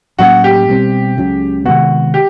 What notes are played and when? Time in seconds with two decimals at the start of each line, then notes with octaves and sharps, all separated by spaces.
0.19 A2 F#3 A#3 C#4 F#4
0.44 G4
0.68 B2 G3 C4
1.17 C#2 C#3 F#3
1.65 C3 D#3 G#3 B3 F#4
2.14 G4